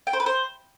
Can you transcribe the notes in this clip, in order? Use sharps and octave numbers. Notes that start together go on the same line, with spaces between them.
G5
C5
B4
C5